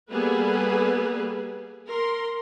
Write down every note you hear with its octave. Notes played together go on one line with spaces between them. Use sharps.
G3 A#3 B3 G#4 A4 B4
A#4 C6